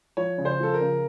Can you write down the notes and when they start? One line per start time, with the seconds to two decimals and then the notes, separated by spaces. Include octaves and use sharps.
0.17 F3 C#5
0.38 C#3
0.45 C5
0.60 F3 A4
0.74 A#4
0.81 C#3